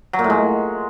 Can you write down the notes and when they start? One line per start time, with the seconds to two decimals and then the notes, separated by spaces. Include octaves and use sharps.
0.13 F#3
0.19 A#2
0.24 A2
0.30 G#3